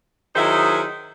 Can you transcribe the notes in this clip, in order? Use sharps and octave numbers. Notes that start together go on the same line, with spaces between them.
D#3 F#3 D#4 E4 G#4 C5